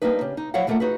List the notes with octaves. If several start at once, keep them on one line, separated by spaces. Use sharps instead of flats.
G3 A#3 C4 D4 D#4 B4
C#3 G4
D#4
F3 F#3 E4 C#5 F5 F#5
D#2 G3 A3 A#3 F4 F#5
D#4 F#4 G#4 B4